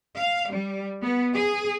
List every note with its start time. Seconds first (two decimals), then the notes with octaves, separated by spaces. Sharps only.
0.18 F5
0.50 G3
1.01 B3
1.33 G#4